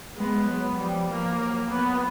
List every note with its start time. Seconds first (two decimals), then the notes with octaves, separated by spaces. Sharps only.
0.17 G#3 B3
0.47 F#3
0.78 F3 G3
1.09 F3 A#3
1.40 F#3
1.71 F#3 B3